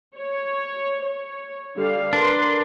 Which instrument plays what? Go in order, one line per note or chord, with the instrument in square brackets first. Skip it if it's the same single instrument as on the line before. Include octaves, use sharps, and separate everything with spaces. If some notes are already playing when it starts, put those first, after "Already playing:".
[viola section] C#5
C#5
D3 G3 F5
[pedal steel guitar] D4 [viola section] A#4 B4 C6